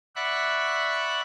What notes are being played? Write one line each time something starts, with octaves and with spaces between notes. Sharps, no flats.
D5 E5 F#5 B5 C#6 F#6